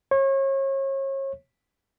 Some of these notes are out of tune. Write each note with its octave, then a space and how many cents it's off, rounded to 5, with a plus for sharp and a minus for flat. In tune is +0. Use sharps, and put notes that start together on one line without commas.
C#5 -35